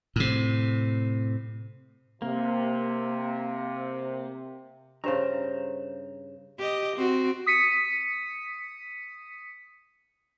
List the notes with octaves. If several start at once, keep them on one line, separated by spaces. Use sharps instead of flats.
A2 C3
C3 A#3
G2 C#3 C5 A#5
G4 D#5
C4 F#4
D#6 B6 C#7 D#7